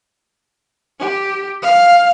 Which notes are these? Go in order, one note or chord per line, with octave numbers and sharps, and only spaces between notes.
G4
F5